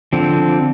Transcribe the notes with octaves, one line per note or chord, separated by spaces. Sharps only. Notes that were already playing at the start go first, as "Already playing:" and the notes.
D3 F3 C4